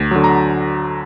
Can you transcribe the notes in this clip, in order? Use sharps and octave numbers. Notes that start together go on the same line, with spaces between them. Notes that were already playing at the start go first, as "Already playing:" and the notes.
Already playing: D2
D3 F#3
A#5